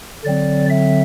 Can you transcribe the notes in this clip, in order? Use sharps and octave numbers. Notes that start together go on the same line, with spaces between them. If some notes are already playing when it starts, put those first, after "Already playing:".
D3 F#3 C4 D5
E5